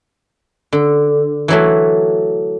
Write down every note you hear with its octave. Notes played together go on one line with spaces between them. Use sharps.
D3
E3 F#3 A3